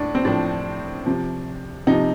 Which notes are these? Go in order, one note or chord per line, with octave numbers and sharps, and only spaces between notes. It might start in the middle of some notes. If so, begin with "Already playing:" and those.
Already playing: A2 D4
C4
A2 F3 D4
C3 F3
C3 F3 D#4